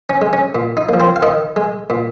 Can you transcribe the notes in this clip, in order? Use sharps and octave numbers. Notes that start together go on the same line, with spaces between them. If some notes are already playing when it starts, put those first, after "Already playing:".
C#4
G#3
C#4
A#2
D#4
F3 A#3
C4 C5
F5
D#3 D#4 D#5
G#3
A#2